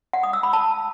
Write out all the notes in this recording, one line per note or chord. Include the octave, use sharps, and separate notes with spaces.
F#5
D#6
E6
B5
A5